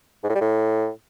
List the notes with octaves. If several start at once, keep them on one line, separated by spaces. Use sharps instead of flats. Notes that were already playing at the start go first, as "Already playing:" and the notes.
G#2
A2
G3
A2